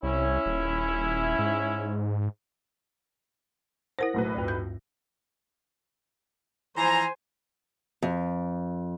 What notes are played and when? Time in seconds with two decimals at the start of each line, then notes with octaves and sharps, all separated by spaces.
0.03 C2 C#4 E4
0.46 D#1
1.39 G#2
3.99 E4 A#4 C5 F#5 A#6
4.14 B1 A2 B4
4.34 D2 G2
4.48 G6
6.77 E3 F3 C5 G#5 A#5
8.02 F2